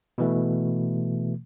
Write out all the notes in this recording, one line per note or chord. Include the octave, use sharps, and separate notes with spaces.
B2 E3 A3